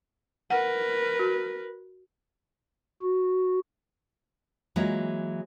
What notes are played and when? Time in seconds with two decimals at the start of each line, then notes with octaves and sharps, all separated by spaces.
0.50 A#4 B4 F#5
1.19 F#4
3.02 F#4
4.76 E3 F#3 G#3 A#3 F4 G#4